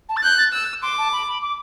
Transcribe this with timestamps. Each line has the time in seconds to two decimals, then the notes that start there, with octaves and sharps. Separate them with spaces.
0.09 A5
0.16 A6
0.23 F#6 G6
0.38 A6
0.53 E6 F#6
0.82 C6 D6
0.98 A5
1.12 B5
1.28 B5
1.42 D6